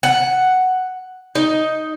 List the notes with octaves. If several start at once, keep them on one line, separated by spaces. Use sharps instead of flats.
F#5
D#4